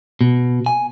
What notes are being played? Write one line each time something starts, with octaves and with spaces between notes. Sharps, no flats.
B2
G#5